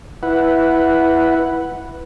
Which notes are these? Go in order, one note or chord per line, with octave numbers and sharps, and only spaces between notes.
E4 B4 F#5